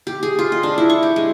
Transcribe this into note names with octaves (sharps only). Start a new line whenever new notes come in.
G4
G#4
F4
D#5
D4
E4
C#6
G4
G#3